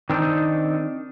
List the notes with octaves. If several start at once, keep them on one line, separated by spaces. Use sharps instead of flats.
D#3 C4 D4 D#4